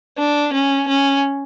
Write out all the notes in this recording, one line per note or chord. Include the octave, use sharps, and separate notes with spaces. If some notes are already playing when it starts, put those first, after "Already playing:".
D4
C#4
C#4